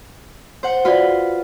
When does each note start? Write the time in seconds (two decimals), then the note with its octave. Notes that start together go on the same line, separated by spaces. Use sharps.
0.63 C5 F#5
0.85 F4 F#4 B4 D5